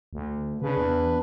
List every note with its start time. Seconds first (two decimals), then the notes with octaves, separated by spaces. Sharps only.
0.13 D2
0.62 C#3 D4 B4
0.77 E2